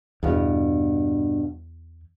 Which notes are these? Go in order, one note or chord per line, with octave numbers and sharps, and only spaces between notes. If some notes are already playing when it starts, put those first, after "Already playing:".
E2 G2 B2